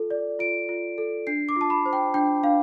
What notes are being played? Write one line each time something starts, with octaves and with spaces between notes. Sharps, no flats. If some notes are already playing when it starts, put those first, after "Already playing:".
Already playing: F4 A4
D5
F4 D7
F4
A4
D4 C7
D6
F4
A5
B5
C5
G5
D4 G5
D4 F5